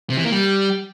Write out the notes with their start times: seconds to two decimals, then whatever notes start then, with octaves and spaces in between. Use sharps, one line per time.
0.10 C3
0.17 E3
0.24 A#3
0.32 G3